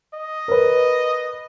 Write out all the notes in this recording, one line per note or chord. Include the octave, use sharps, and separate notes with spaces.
D#5
A#4 B4